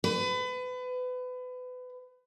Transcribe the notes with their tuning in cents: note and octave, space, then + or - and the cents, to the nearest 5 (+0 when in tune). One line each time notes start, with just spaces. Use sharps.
B4 +30